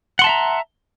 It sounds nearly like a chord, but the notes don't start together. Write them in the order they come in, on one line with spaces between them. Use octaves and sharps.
F#5 C6 A5 E5 A#5